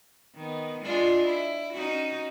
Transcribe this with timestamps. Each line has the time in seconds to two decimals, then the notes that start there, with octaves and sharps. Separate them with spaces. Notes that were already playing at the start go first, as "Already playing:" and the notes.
0.35 D#3 B3
0.82 G#3 D4 F4
1.26 E4
1.73 C#4 D#4 F#4